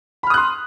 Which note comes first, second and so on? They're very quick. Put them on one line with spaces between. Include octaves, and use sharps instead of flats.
B5 F6 D#6 F#6 C6